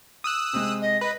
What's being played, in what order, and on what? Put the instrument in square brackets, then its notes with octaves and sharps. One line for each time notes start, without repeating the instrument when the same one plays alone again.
[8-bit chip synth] D#6 E6 F#6
[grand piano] C3 G#3
[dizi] D#5
[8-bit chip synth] B4 [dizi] D#5